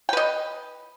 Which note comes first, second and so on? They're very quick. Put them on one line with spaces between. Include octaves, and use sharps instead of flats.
G5 B4 D#5